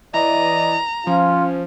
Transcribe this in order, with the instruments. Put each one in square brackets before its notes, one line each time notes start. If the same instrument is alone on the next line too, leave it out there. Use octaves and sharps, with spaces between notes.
[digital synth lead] E3 [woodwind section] D5 D#5 [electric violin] A#5
[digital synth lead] F3 [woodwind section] C#4 [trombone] F4